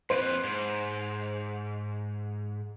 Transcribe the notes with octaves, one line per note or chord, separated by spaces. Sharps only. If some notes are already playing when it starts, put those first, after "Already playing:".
F2 B4 C5
G#2